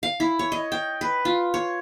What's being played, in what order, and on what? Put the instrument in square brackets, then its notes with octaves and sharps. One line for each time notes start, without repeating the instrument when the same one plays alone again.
[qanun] F5
E4
C#5
D#5
G5
B4
F4
C#5